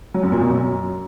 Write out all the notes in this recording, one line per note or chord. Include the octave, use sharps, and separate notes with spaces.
F#3
F#2
A#2
B2
F#2